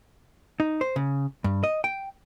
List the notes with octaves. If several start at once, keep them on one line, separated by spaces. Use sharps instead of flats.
D#4
C5
C#3
G2
D#5
G5